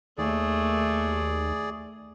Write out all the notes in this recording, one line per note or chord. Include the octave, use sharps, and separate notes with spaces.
D#2 A3 G#4 D5